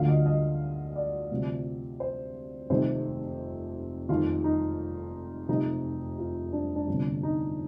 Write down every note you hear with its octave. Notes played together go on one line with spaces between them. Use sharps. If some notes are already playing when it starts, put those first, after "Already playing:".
Already playing: D2 D3 F3 F5
D#5
D#5
D5
D2 C3 F3
C5
F1 F2 C3 D#3 C5
F1 F2 D#3 F4
D#4
F1 F2 C3 D#4
F4
D4
D4
G1 F2 C3
D#4